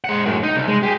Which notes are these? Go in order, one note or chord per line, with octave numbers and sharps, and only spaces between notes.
G#3 F#5
F#2 A2
D#4
C2
G#3
G4 G#4